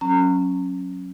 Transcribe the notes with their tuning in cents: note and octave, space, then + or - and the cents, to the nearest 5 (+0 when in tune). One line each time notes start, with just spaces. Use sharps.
F#3 -5 C#4 -15 A#5 -30